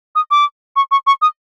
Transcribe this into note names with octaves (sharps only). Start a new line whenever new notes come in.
D#6
D6
C#6
C#6
C#6
D#6